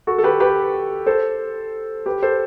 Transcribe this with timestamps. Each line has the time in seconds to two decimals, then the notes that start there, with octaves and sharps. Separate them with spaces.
0.07 F#4 A4
0.18 A4
0.24 G4 B4
0.40 G4 B4
1.06 A4 C5
2.06 G4 B4
2.23 A4 C5